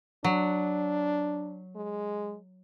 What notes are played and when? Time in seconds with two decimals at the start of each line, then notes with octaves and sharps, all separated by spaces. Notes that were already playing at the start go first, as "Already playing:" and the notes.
0.24 F#3 D4
1.76 G#3